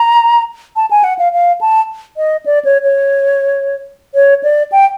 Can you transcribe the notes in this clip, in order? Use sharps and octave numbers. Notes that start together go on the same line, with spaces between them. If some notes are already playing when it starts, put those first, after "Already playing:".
Already playing: A#5
A5
G#5
F#5
F5
F5
A5
D#5
D5
C#5
C#5
C#5
D5
G5